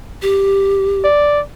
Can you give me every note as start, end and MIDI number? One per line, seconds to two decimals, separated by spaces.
0.22 1.04 67
1.04 1.41 74